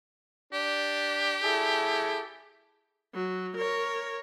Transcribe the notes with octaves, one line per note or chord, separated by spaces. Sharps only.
D4 G4
E4 G#4 A4
F#3
A#4 C#5